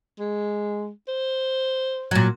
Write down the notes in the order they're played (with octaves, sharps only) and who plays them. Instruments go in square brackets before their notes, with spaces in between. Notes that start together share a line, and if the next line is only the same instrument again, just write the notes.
[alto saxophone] G#3
C5
[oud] A#2 F#3